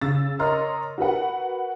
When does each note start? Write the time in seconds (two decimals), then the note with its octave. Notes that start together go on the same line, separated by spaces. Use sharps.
0.01 C#3 E6 A6
0.39 A#4 C#5 D#5 A#5 C6 F6
0.98 F#4 A#4 B4 F#5